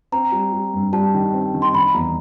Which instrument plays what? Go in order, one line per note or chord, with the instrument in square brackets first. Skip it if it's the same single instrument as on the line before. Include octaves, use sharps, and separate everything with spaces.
[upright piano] C4 [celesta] A#5
[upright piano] G3
G3
G2
[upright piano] G3 [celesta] A5
[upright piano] D#3
C4
D#3
[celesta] C6
[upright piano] D#3 [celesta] B5
[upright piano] E2 [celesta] A#5